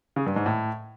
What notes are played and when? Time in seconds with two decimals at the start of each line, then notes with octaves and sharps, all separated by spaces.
0.16 C#3
0.26 G2
0.36 G#2
0.46 A2